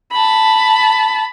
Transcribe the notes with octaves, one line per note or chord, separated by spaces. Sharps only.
A5 B5